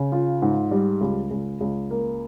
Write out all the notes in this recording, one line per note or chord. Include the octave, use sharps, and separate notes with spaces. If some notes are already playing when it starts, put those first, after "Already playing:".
Already playing: C#3
F4
G#2
G3
C#2
C#2
C#2
A#3